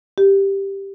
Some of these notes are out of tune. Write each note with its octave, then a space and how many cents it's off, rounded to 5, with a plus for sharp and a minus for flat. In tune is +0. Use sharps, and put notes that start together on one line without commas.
G4 +5